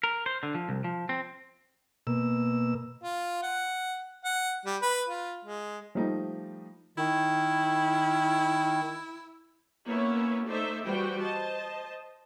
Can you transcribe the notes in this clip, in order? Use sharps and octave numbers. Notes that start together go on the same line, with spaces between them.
A#4
C5
D3
F3
C2
F3
C4
B2 A#3 E6
F4
F#5
F#5
G3
B4
F4
G#3
F3 G3 A3 D#4
D#3 E4
A#3 B3 C#4 E4 C#5 E5
A3 D#4 C5 D5 E5
E3 G3 F#4 C5 G5
C5 D#5 A5